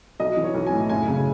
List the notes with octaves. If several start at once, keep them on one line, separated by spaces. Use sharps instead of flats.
B1 D#5
E3
C#5
B1
G#5
A2
F#1 G#5
C#3